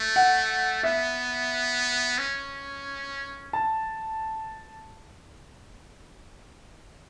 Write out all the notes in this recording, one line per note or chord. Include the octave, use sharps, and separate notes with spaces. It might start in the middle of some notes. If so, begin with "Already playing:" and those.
Already playing: A3
F#5
B3 E5
C#4
A5